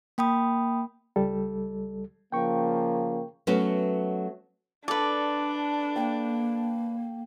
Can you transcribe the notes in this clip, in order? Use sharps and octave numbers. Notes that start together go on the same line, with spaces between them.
A#3 G5 B5 D#6
C#2 G3 A4
C#3 F3 A#3 G5 C#6
F#3 A3 B3 C#4
D4 A4 B4 D5 D6
A#3 G5